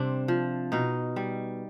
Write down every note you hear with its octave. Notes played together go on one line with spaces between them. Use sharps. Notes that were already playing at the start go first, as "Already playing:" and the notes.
Already playing: C3 G3 C4 D4
F3
B2 D#4
G3